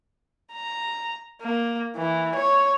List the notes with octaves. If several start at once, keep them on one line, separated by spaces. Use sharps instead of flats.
A#5
A#3
E3
C#5